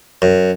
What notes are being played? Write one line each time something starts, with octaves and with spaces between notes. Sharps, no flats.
F#2